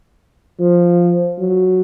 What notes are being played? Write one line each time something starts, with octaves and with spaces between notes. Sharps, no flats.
F3
F#3